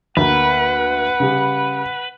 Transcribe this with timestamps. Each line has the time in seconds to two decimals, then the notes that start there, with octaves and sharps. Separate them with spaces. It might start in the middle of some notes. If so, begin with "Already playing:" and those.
0.17 D2 A#3 B4 F#5
1.20 C#3 G3